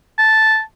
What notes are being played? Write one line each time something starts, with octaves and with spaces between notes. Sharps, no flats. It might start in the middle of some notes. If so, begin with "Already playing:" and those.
A5